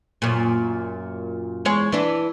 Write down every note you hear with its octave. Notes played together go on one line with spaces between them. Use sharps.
F#2 A#2
E2 G#3 C#5
E3 D4